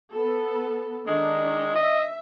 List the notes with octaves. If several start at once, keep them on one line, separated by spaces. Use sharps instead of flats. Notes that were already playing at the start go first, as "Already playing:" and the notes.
B3 A4
D#3 G#3 D4 D#4
D#5 E5